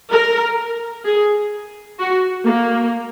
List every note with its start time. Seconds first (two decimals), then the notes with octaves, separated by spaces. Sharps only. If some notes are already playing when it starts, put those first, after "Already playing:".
0.12 A#4
1.05 G#4
1.99 F#4
2.46 A#3